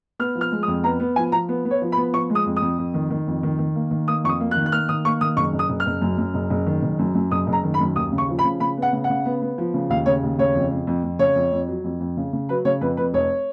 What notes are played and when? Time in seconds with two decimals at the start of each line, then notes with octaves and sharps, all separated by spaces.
0.19 B3 F6
0.35 F3
0.41 F6
0.52 G#3
0.63 D#6
0.68 F2
0.84 B3 A#5
1.00 B3
1.16 F3 G#5
1.32 F3 A#5
1.49 B3
1.65 B3
1.71 C#5
1.82 F3
1.92 B5
1.97 B3
2.13 F3 C#6
2.30 G#3
2.35 D#6
2.46 F2
2.56 D#6
2.62 F2
2.78 F2
2.94 D#3
3.10 D#3
3.27 F2
3.43 D#3
3.59 D#3
3.76 A#3
3.91 D#3
4.08 A#3 D#6
4.24 F2 C#6
4.29 D#6
4.40 A#3
4.51 F#6
4.57 D#3
4.66 F#6
4.72 A#3 F6
4.89 D#3 D#6
5.05 A#3 C#6
5.21 D#3 D#6
5.37 F#1 C#6
5.53 F#1
5.59 D#6
5.69 F#1
5.80 F6
5.86 F#1
6.02 F#2
6.18 F#2
6.34 F#1
6.50 F#1
6.66 D#3
6.83 F#1
6.99 F#2
7.15 F#2
7.31 F#1 D#6
7.47 F#1
7.53 A#5
7.64 D#3
7.74 B5
7.80 F#2
7.96 D#2 D#6
8.12 C#3
8.18 C#6
8.29 F3
8.39 B5
8.45 C#3
8.60 C#3 B5
8.77 B3 F#5
8.93 C#3
9.04 F#5
9.10 C#3
9.25 B3
9.42 B3
9.58 F3
9.74 C#3
9.90 D#2 F5
10.06 C#3 C#5
10.23 D#2
10.38 C#3 C#5
10.54 F2
10.71 F2
10.87 F2
11.04 F2
11.19 C#3 C#5
11.36 F2
11.52 F2
11.68 F#3
11.84 F2
12.00 F2
12.17 C#3
12.33 C#3
12.49 F#3 B4
12.65 C#3 C#5
12.81 F2 B4
12.97 F2 B4
13.14 F1 C#5